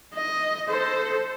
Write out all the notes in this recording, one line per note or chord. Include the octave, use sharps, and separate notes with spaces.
D#5
A4 C5